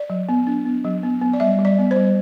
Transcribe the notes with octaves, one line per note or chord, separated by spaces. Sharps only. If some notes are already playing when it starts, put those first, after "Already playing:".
Already playing: D5
F#3
B3
D4
B3
F#3
B3
B3
D5
G3 E5
G3
D5
B3
C5
G3